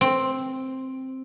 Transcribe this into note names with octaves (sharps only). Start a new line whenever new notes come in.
C4